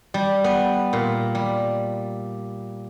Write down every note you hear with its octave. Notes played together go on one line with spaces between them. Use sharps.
G3
B3
A#2
G3